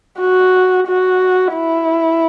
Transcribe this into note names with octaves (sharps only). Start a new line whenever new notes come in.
F#4
F#4
E4